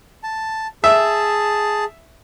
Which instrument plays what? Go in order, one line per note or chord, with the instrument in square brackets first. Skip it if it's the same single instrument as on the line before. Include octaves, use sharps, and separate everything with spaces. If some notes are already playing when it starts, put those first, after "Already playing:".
[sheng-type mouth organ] A5
[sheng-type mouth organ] G#4 A5 [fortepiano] E5